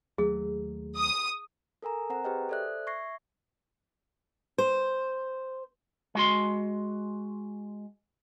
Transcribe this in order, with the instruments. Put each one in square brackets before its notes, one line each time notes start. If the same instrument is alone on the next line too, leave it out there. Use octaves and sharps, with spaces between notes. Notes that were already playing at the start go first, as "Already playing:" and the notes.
[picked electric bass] D#2 F#3 A3 [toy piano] G#4
[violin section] D#6
[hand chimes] A4 A#4 G#5 A#5
C4 C5 F#5 A#5
G4 G#4 B4 C5 D#5 G5
A4 C5 D5 E5 F#6
E5 C#6 G#6 A#6 C7
[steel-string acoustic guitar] C5
[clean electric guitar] G#3 F#4 C6